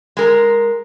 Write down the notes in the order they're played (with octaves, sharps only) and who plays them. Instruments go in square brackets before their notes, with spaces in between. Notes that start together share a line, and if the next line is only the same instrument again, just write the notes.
[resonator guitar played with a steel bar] G#3 A#4